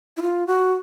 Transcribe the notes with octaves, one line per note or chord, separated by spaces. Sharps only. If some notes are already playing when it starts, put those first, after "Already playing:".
E4
F4
F#4